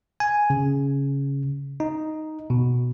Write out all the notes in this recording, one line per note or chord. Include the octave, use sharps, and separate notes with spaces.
G#5
C#3
D#4
B2